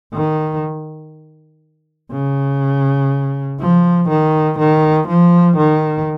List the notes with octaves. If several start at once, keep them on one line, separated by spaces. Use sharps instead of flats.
D#3
C#3
F3
D#3
D#3
F3
D#3